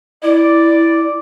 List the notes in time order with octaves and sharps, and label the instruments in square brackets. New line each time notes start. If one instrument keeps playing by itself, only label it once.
[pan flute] E4 [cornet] D5